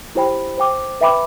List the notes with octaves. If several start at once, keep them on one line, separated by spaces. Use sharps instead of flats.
E4 G4 C5 G5 B5
C5 G5 D6
B4 E5 G5 B5 D6